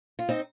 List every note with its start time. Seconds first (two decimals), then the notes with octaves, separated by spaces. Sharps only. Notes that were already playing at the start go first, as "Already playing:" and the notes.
0.19 F4
0.29 C4 D#4